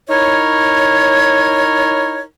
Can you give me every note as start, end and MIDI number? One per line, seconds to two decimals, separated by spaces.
0.09 2.21 63
0.09 2.21 64
0.09 2.21 70
0.09 2.21 73